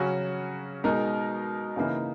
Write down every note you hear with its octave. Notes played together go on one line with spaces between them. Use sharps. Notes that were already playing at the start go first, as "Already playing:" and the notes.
Already playing: C#3 F#3 C#4 F#4
B2 G#3 D#4 A#4
C#3 E3 A#3 D#4